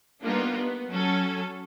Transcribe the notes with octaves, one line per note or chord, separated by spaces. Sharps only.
G3 A#3 B3 D4 D#4 F4
B3
F#3 C#4 A4